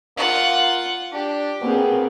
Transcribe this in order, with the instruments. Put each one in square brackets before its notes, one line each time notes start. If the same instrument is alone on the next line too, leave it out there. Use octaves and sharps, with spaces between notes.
[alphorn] A#3 [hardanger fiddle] F4 F#5
[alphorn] D4 [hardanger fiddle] G4
[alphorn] B2 [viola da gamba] A#3 C4 G#4